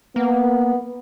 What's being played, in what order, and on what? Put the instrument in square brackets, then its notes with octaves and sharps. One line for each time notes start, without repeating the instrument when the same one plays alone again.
[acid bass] A#3 [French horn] B3